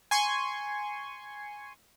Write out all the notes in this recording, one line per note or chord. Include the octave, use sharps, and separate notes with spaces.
G#5 C6 C#6